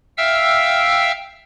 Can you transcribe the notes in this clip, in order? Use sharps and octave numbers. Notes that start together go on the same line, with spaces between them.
E5 F5 G5 E6 F6